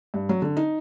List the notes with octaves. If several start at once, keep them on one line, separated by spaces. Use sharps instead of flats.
G2
F#3
D3
D#4